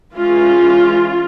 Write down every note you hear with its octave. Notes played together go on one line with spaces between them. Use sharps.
E3 G#3 C#4 F4